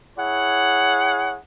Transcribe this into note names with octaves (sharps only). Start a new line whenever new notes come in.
E4 G#4 C#5 F#5